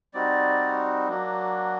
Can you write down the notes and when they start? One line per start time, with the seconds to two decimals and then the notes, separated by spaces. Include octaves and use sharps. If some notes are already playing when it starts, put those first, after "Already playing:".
0.14 G3 C4 D#4 F#4 D5
1.09 F#3 A#3 D4 F#4